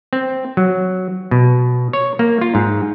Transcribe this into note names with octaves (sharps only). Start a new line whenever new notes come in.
C4
F#3
B2
C#5
A#3
F4
G#2